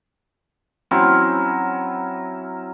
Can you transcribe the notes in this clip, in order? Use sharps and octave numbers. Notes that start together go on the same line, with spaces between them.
F#3 C4 C#4 E4